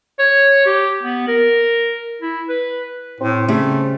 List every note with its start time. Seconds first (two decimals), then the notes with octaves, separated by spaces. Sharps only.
0.19 C#5
0.66 G4
1.03 B3
1.28 A#4
2.21 E4
2.49 B4
3.21 A2 C4
3.48 C#3 G3 A3